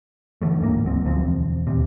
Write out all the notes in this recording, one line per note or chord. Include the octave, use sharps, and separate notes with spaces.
D3 E3 G3 A3
D1 G#2 A#3
D2 F#3 C4
D2 F3 B3 C4
E1
D#1 D2 C3